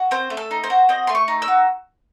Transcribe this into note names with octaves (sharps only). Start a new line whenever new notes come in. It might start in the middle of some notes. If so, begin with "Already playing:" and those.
Already playing: F#4
C4 C5
A3
A4
D#4
C5
F#4
C4 D#5
A3 C6
C#6
D#4
E6
F#4